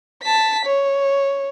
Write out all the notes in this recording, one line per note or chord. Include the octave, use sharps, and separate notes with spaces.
A5 B6
C#5